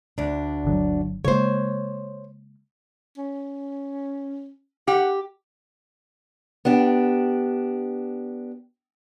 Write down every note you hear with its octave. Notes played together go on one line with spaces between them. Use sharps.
D2 D4
G1 D3 F#3
C#3 G#3 A#3 C5 C#5
C#4
G4 F#5
B3 D4 G4